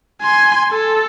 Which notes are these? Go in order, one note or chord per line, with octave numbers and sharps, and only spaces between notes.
G#5 C6
A4